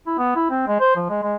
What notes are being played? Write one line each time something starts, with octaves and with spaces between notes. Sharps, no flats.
E4
B3
E4
C4
G#3
C5
F3
G#3
G#3